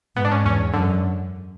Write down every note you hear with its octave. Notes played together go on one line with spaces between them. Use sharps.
G#2 B3
D4
C#4
E2 C#4
F#2 D3